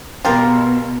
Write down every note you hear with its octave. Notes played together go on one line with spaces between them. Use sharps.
B2 F4 G4 A#4